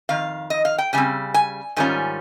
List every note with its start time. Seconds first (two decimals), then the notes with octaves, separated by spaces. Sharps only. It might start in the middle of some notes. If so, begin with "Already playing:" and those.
0.09 F2 D#3 F5
0.50 D#5
0.65 F5
0.78 G5
0.93 C#3 G3 C4 G#5
1.34 G#5
1.76 G#2 D#3 G3 C#4 F4 G#5